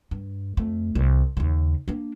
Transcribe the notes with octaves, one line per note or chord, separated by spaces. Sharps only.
G2
F2 A3
C2
D#2 C#3
A#3 D4